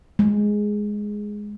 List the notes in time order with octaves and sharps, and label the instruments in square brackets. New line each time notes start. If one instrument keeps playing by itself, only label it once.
[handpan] G#3